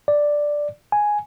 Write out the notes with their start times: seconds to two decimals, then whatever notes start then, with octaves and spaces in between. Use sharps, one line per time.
0.08 D5
0.92 G#5